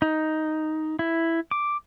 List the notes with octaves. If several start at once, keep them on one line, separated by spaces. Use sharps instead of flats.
D#4
E4
D6